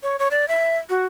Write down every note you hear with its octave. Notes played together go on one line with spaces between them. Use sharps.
C#5
C#5
D5
E5
F#4